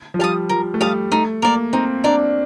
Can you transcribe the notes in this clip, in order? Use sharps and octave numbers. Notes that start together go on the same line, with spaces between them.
F3
G3 F5 A5 D#6
F3 A#4
A3
G3 F5 A5 D#6
A3 D#4
A#3 A#4 D5
C4 D#4
D4 A#4 D5